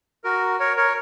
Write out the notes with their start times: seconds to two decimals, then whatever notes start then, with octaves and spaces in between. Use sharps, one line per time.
0.24 F#4 A#4
0.60 A#4 C#5
0.77 A#4 C#5